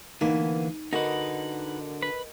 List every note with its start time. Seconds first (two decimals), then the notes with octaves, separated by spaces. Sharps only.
0.21 D3 E3 A#3 B3 D#4
0.93 D3 D#4 F#4 A#4 B4 D#5
2.02 B4